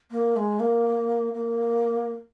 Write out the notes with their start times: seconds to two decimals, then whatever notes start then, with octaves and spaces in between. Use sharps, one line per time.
0.11 A#3
0.36 G#3
0.60 A#3
1.33 A#3